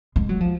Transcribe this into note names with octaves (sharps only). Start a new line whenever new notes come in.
G#3
F#3
F3